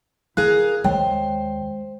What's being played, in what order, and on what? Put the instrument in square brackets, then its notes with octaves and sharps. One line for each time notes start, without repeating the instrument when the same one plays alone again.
[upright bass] E4 [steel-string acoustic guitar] G#4 A#4 F5 [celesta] F#6
[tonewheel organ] D#2 [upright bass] G#3 [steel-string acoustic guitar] C5 [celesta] C#5 G5